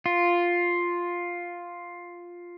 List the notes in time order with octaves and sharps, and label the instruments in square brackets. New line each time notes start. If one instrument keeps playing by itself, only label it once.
[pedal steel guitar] F4